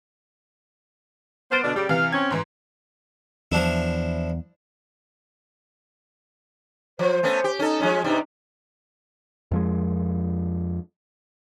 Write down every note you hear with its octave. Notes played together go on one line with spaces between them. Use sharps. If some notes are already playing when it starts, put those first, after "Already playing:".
B3 C5 F6 A6 D7
B2 D3 D4
C#3 G3 G4
C3 E3 F5
C4 C#4 G#6
G#2 E3
E2 F3 D4 E4
F3 C5
A3 B3 C#4
G4
C#4 D#4 A4
F3 G#3 C#4
G2 C3 G3 D#4
F2 F3 G#3